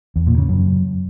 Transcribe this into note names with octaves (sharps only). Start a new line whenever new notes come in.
E2
A#2
C#3
F#2